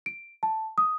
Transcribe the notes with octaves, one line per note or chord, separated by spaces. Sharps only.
D7
A5
D#6